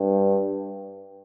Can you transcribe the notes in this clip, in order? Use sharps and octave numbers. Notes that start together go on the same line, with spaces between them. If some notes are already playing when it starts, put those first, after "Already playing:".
Already playing: G2